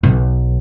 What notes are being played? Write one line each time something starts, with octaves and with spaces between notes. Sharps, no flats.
B1